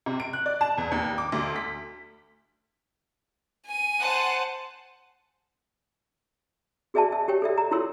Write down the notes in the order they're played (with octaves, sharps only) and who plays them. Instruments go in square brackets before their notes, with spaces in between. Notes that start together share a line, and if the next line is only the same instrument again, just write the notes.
[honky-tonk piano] C3
D7
F#6
D5
A5
E2
D#2
D6
D2
B6
[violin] G#5 D#7
[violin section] C5 F#5 A5
[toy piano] F#4 G#4 D5 E5 G#5 A5
E5
G4 C#5 G5
A4 D5 E5
A#5
E4 F4 A4 C#5 C6 E6